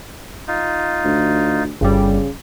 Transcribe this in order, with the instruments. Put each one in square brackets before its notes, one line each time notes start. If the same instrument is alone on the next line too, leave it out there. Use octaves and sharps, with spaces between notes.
[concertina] D#4 F4
[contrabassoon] D2
[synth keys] G1 G2 G3 [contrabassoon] C#3